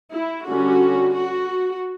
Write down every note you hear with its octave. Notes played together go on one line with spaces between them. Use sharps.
E4
D3 G3 C#4 F#4
F#4